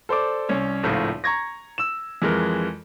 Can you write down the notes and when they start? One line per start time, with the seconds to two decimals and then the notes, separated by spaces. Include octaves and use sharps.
0.09 A4 C5 D5 D6
0.49 C2 C#4 C#5
0.83 G#1 C#2 A2 F3
1.24 A#5 C#6 G#6 A#6
1.78 E6 E7
2.22 F2 E3 G#3 A#4